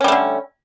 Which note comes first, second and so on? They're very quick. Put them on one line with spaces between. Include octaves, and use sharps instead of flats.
C#4 G3 A3 D3